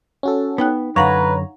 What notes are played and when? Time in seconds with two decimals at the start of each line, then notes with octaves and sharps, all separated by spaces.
0.23 C#4 F#4 A4
0.58 B3 D#4 G5 F#6
0.96 F#2 D3 B4 C#5 F5 F#5 A#5